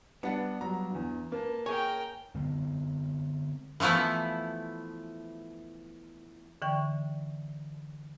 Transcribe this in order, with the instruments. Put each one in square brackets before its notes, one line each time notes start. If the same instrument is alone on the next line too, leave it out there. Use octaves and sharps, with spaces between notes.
[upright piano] G3 [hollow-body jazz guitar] B3 [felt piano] D4 F#5 A5
[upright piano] F#3 G3 F4 [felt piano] A#5
[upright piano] E2 G2
[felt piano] A#3 [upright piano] B4 [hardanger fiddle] A5
[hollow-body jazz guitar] G#4 C#5 [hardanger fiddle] A#4 G5 [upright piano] G#5
[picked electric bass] D3 G#3 B3 C4
[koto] E3 F3 A3 B3 E4
[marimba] D3 E3 D5 G5 C#6